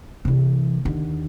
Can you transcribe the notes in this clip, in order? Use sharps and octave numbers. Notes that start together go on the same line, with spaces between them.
C3 E3
D#2 D3